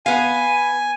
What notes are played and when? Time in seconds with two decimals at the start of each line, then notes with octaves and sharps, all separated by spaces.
0.06 B3 F5 G#5